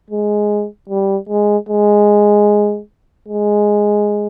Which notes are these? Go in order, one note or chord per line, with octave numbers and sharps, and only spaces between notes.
G#3
G3
G#3
G#3
G#3